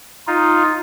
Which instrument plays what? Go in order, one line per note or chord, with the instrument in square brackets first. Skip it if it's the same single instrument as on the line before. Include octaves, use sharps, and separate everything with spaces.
[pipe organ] D#4 F4